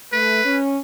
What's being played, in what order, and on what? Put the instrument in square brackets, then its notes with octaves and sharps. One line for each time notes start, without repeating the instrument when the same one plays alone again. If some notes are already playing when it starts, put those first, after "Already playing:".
[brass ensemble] A3 [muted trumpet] B4
[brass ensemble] C#4